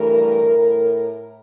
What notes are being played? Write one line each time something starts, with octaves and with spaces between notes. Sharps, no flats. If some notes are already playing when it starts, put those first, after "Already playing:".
Already playing: G2 E3 A3 A#4
A2